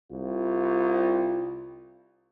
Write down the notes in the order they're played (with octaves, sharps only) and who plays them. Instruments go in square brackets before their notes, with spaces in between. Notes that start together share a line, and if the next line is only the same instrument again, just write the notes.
[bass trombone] C2 [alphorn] F4